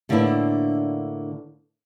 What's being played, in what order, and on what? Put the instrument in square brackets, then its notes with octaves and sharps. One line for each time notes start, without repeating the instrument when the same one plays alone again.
[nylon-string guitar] A2 D3 A#3 B3 D4 E4